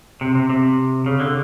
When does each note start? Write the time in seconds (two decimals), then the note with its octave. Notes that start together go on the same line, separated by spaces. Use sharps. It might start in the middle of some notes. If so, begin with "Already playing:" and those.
0.21 C3
0.35 C3
0.50 C3
1.06 C#3
1.20 D3